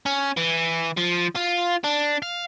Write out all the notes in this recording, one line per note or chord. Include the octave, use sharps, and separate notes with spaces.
C#4
E3
F3
F4
D4
F5